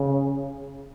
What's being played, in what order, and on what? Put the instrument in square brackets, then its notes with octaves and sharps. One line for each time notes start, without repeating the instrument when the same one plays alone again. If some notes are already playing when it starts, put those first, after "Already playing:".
Already playing: [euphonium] C#3